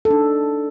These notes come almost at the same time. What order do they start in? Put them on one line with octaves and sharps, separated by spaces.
A4 D#4 D4